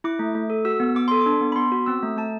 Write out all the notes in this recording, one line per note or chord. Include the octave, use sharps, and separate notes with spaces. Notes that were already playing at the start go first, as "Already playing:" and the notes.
E4 D6
A3
A3
A4
F#4 E6
B3
B3 D6
A4 C6
D6
D4
B3
B5
B3 C6
F#4
C4 E6
A3
A3 A5